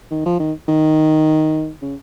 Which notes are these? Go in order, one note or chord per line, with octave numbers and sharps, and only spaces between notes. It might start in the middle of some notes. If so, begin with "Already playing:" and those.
D#3
F3
D#3
D#3
C#3